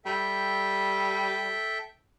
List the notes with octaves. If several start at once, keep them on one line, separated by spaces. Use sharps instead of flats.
G3 A4 E5 G5